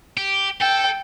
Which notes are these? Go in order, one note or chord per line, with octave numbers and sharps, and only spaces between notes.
G4
A4 G5